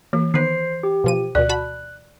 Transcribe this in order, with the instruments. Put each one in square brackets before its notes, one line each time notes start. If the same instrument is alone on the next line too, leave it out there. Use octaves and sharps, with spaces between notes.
[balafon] E3 [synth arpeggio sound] A#3
[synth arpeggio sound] D#3 B3 B4 [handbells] C5 C7
[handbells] G4
[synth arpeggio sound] B2 F3 D#7
[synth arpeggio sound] D2 B2 [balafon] D5 [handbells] F#6
[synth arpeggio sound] F#4 A5 B5